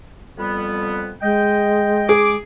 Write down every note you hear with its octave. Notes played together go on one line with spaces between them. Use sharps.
F2 G3 B3
G#3 D#5 G5
G#4 D6